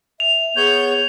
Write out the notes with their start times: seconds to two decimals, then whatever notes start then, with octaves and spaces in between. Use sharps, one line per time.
0.20 E5 F7
0.56 B3 G#4 C#5 G6